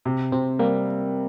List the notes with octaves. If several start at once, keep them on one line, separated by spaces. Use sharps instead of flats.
C3
C3 C4
G3 A#3